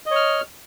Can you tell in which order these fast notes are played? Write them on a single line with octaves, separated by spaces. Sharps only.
D#5 C#5 F6